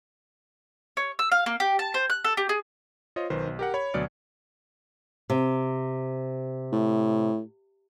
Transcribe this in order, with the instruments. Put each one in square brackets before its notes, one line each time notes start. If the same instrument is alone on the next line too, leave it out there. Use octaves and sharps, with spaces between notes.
[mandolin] C#5
E6
F5
A#3
G4
A5
C5
F#6
A4
G4
G#4
[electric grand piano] F4 C5 C#5 D#5
B1 D#3 B4 C5
B1
G4 A#4 F#5
C#5 B5 G#6
D2 B2 F#3 D5 F6 C#7
[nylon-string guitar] C3
[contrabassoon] A2